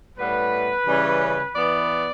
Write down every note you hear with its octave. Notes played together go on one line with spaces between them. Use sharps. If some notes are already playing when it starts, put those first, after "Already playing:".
A2 G3 B3 B4
C#3 E3 G3 C#4
E3 B3 D5